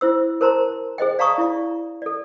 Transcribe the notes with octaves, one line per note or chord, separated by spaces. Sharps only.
E4 C5 E6
A#4 C5 A5 A#5 C6
G#4 C5 D#5 G5
D5 F5 A5 A#5 C#6 D#6
E4 D5
A4 D5